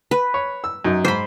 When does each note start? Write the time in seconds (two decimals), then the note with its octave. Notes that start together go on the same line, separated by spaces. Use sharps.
0.11 B4
0.34 C#5
0.64 E6
0.85 F#2 D#4
1.05 G#2 C5 B5